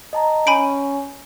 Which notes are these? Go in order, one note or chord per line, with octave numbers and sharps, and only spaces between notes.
D#5 A5 A#5
C#4 G#5 B5 G6 D7